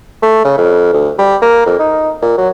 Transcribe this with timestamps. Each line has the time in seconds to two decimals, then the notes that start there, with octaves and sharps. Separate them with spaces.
0.22 A3
0.44 C#3
0.58 F2
0.92 D2
1.18 G3
1.42 A#3
1.66 F2
1.79 D#4
2.22 A#2
2.38 F#3